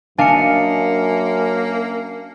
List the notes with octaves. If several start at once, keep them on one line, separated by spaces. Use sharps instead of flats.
F#2 A#3 D4 D#5 F5 G#5 A5 C#7